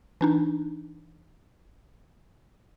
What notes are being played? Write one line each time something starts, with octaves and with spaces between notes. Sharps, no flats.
E3 D4 D#4